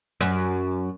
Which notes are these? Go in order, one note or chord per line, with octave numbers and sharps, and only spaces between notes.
F#2